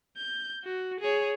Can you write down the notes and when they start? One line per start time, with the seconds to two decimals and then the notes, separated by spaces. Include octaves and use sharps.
0.17 G6
0.64 F#4
1.00 G#4 C#5